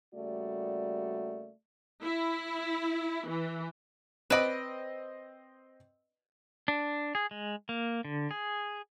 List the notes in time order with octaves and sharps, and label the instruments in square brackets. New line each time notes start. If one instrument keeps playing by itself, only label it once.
[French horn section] C#3 G3 A3 A#3 F#4 D5
[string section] E4
E3
[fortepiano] C4 D#5 [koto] B4 D5
[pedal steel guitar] D4
G#4
G#3
A#3
D3
G#4